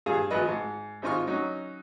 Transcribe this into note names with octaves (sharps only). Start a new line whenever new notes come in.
G2 G#4 F5
G#1 F3 B4 D#5
G#2
G#1 C4 D#4 F4 C#6 F6
F#3 C#4 D#4